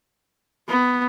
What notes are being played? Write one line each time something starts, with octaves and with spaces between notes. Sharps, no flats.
B3